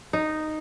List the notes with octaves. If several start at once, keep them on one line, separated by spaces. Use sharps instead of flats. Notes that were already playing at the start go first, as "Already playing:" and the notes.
D#4